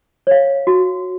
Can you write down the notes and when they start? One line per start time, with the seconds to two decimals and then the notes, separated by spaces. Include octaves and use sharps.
0.27 C#5 F5
0.67 F#4